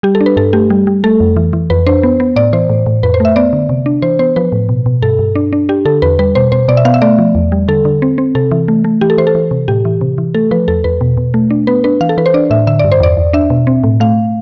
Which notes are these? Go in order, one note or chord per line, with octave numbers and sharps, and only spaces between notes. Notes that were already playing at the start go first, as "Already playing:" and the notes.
G3 G4
A4
D4
B4
G2 A4
A3 G4
G3
G3
A3 A4
F2
E3
E3
F2 B4
D4 C5
B3
B3
A2 D5
E3 C5
A2
A2
F2 B4
C5
A3 E5
B3 D5
D3
C3
D4
E3 C5
B3 C5
F3 B4
A2
B2
B2
G2 A4
G2
D4
D4
D4 G4
D3 A4
E2 B4
G3 B4
B2 C5
B2 C5
B2 D5
E5
B3 F5
E5
A3 D5
F3
E2
G3
D3 A4
D3
C4
C4
C3 A4
E3
A3
A3
E3 G4
A4
E3 C5
A4
E3
C3
A2 G4
E3
C3
E3
A3 A4
F3 B4
E2 A4
E2 B4
B2
B2
A3
D4
B3 B4
D4 B4
E3 F5
A4
E3 B4
C5
D4 D5
A2 E5
D3 E5
G2 D5
C5
E2 D5
E2
D4 E5
B2
C4
A2
A3 F5